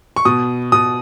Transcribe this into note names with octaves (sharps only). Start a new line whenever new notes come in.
C#6
B2 D#6
B2 D#6